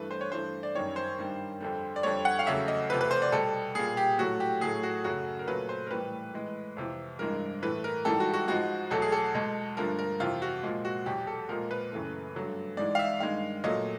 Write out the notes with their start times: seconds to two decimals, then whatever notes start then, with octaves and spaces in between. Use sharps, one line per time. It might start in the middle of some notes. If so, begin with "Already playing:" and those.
Already playing: G2 E3 A3 B4
0.11 C5
0.21 C#5
0.32 G2 E3 A3 C5
0.63 D5
0.75 F#2 D#3 G3 C#5
0.96 C5
1.18 G2 D#3 G3
1.61 F2 D3 G3
1.96 D5
2.03 F2 D3 G3 C#5
2.25 F#5
2.39 F5
2.46 E2 C#3 F#3 A3 E5
2.68 D#5
2.90 E2 C3 F3 A3 B4
3.01 B4
3.11 C5
3.22 D5
3.32 B2 G3 A4
3.75 A#2 G3 G#4
3.97 G4
4.18 A2 F#3 A3 F#4
4.40 G4
4.61 A2 F#3 A3 G#4
4.83 F#4
5.04 F#2 C#3 F#3 A3 F#4
5.39 A#4
5.47 A#2 F#3 A3 B4
5.69 C5
5.87 A#4
5.91 A2 E3 G3 B4
6.33 A2 E3 G#3
6.77 F2 C3 E3
7.19 G2 E3 G#3 A#4
7.62 A2 E3 A3 B4
7.84 A#4
8.05 G#2 E3 G3 A4
8.20 F#4
8.34 F#4
8.48 G#2 F3 G#3 F#4
8.91 E2 B2 F#3 A3 A4
9.02 G#4
9.12 A4
9.35 B2 G#3
9.77 G2 D3 F3 A3 A#4
9.99 A#4
10.20 F2 C3 E3 F4
10.42 F#4
10.63 A#2 F3 G#3
10.85 F#4
11.06 E2 B2 F#3 G4
11.27 A4
11.49 A#2 F3 G#3 A#4
11.71 B4
11.92 F#2 C#3 E3 A3
12.35 G2 D3 F#3 A3
12.77 G#2 E3 G#3 D5
12.95 F5
12.99 E5
13.20 G2 D#3 G#3 F5
13.64 A#2 F#3 A3 D#5